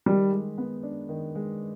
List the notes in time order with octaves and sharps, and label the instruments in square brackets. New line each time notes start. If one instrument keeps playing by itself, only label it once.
[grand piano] D#3 [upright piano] G3
[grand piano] G#3
B3
D4
D#3
G#3